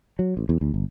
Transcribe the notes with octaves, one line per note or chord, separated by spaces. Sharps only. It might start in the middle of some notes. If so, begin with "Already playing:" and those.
F#3
A1
E2
D2
G1